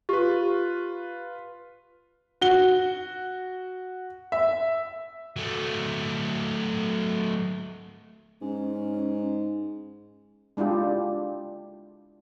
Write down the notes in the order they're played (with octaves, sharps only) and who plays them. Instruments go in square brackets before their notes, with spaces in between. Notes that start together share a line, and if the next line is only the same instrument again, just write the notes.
[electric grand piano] F4 B4 [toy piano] G4
[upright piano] F#4 G7
[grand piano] E5
[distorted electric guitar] F#3 A3
[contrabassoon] G#2 [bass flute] C#4
[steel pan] G#3 D4 E4 F4 G4